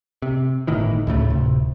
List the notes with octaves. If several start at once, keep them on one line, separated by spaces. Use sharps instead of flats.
C3
G1 A2 D#3 E3
D2 A2 C#3 A3
D1 C3